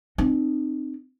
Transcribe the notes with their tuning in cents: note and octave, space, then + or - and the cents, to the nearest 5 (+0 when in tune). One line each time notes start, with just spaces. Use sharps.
C4 +0 D#4 -30